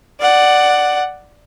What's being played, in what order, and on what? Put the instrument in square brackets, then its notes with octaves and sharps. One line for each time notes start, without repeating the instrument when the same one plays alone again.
[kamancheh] D5 F#5